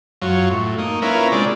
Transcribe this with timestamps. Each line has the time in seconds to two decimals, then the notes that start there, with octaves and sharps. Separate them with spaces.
0.22 F#2 F#3 F4 C#5
0.50 A2
0.79 A#3 D#4
1.02 A#3 C#4 E4 F4 A#4 B4
1.32 C3 G#3 D4 D5